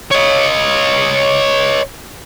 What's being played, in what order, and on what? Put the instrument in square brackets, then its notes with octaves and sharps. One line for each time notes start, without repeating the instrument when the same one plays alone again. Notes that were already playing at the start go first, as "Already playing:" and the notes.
[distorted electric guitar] C#5 D#5